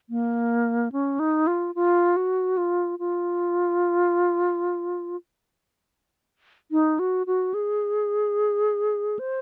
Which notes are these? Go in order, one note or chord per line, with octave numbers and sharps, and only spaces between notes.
A#3
C#4
D#4
F4
F4
F#4
F4
F4
D#4
F#4
F#4
G#4
C5